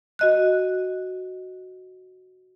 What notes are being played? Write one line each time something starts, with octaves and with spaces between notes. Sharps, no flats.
F#4 D#5 F#6